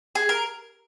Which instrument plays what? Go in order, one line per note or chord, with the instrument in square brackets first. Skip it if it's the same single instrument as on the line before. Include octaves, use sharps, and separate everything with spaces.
[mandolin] G#4
A#4